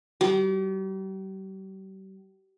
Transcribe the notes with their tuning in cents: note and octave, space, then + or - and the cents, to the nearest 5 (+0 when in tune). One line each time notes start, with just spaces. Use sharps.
G3 -40